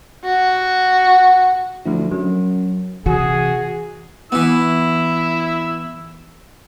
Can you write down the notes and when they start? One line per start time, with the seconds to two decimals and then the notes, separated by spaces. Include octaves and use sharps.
0.25 F#4
1.86 D2 F3 F#3 E4
2.12 F#2 F#3
3.06 C3 E3 F#4 G#4
4.32 E3 B3 E4 E6